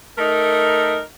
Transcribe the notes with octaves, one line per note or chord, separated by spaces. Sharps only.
A3 D#4 A#4